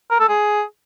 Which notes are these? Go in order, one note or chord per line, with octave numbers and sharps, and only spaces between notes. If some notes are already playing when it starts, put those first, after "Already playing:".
A#4
A4
G#4